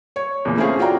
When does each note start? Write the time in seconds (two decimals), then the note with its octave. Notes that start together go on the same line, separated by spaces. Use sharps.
0.16 C#5
0.45 E2 A#2
0.57 A3 C4 C#4 E4 G#4 F5
0.79 F4 F#4 D5 G5 A#5